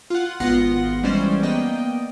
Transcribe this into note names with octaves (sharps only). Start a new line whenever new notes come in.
F4 F#5
G#1 B3 F4 F#5 C6 A#6
E3 G3 G#3 C#4 C5 D5
A#3 B3 D5 D#5 G5